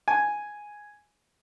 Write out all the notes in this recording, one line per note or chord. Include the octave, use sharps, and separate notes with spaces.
G#5